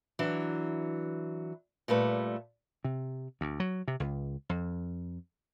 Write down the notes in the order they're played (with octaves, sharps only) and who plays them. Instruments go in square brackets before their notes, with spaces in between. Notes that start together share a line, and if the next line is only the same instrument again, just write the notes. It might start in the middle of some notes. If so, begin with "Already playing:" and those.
[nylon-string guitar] E3 F#3 D4
A#2 G3 A3 B4
[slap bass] C3
D2
F#3
C3
C#2
F2